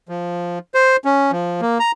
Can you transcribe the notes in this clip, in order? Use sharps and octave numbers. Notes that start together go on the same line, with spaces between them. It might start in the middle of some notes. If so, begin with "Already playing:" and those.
F3
C5
C#4
F3
A#3
A#5